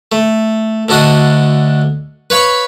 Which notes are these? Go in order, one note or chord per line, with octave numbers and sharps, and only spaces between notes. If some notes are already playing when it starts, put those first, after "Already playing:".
A3
D2 D3 D4 F#4 D#5
B4 C#5 F5 B5 C#6